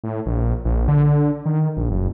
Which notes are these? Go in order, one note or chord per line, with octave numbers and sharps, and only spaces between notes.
A2
A#1
A#1
D3
D#3
A#1
F#1